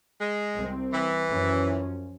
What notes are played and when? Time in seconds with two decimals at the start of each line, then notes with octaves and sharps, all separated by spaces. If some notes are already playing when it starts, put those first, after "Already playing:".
0.19 G#3
0.55 C2 C4
0.91 E3
1.29 F#2 F3 C#4